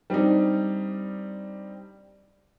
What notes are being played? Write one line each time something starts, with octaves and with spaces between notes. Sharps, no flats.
G3 C4 D4 D#4